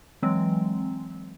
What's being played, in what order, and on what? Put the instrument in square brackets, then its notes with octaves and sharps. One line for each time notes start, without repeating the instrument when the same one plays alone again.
[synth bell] E3 F#3 G#3 C4